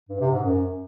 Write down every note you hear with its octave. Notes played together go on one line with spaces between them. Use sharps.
G2
C3
G#2
F#2